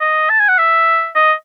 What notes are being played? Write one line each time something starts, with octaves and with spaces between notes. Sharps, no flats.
D#5
A5
G#5
F#5
E5
D#5